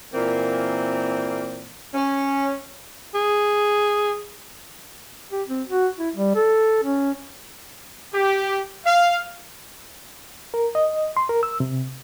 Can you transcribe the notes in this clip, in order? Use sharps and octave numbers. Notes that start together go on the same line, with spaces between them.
A#2 E3 A#3 C4
C#4
G#4
G4
C4
F#4
E4
G3
A4
C#4
G4
F5
A#4
D#5
C6
A#4
E6
C3